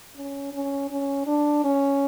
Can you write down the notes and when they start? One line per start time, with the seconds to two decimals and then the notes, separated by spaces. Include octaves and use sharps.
0.16 C#4
0.54 C#4
0.91 C#4
1.27 D4
1.64 C#4